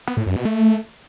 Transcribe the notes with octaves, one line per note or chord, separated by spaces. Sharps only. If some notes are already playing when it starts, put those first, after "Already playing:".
B3
A2
F#2
B2
A3